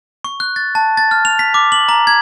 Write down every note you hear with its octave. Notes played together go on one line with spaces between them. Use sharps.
C#6
F#6
A6
A5
A6
F6
F7
B6
D6
F#7
A#5
G#6